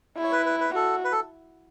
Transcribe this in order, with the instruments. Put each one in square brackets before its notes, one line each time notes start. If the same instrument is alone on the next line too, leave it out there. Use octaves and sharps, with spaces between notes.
[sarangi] E4
[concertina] C#5
B4
B4
B4
[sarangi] F#4 [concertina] A4
[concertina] B4
A4